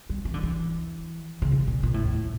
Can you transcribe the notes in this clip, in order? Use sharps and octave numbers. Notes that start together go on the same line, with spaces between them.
G3
E3
D3
E3
C#3
A#2
A#2
A#2
A2
E2